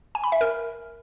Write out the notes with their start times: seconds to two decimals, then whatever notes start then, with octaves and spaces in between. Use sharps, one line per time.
0.15 G#5
0.24 B5
0.32 E5
0.41 A#4